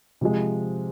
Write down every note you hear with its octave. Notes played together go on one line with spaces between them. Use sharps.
C3 F3 G#3